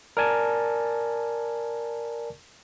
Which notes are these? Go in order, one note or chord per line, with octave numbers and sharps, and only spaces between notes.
A#4 D5 G#5 A5